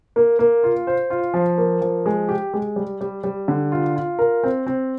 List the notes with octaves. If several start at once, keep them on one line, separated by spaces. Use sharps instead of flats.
A#3
A#3
F4
C5
F4
F3
A#3
F3
G#3
G4
G#3
G3
G3
G3
D3
F4
F4
A#4
C4
C4